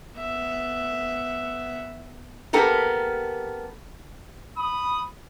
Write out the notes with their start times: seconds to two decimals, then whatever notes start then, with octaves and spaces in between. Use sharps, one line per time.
0.17 B3 E5
2.53 A#3 B3 G4 A4 A#4
4.57 B5 D#6